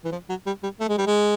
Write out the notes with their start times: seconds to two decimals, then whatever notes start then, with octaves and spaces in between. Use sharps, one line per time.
0.04 E3
0.12 F3
0.29 F#3
0.46 G3
0.63 G3
0.80 A3
0.89 G#3
0.98 G3
1.07 G#3